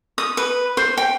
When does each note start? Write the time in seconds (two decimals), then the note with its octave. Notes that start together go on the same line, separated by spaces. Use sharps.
0.18 D#6
0.37 B4
0.77 C5
0.97 G5